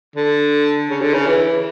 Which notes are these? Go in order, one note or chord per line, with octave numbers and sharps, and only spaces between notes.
D3
C#3
D3
C#3
E3